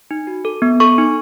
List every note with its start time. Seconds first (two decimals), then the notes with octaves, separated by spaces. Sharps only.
0.11 D#4
0.27 F#4
0.45 A4
0.62 B3
0.80 A4 C#6
0.98 D#4